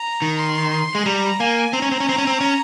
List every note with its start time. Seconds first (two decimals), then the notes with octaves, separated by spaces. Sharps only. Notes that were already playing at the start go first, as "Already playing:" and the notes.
Already playing: A#5
0.22 D#3
0.39 C6
0.95 G#3
1.06 G3 A#5
1.40 A#3 G#5
1.73 C4 A#5
1.82 C#4
1.91 C4
2.00 C#4
2.09 C4
2.18 C#4
2.27 C4
2.41 C#4